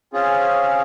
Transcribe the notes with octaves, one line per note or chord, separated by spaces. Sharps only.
C4 C#4 F4 G#4